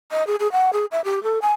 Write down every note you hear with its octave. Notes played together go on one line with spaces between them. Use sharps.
D#5
G#4
G#4
F#5
G#4
E5
G4
A4
G#5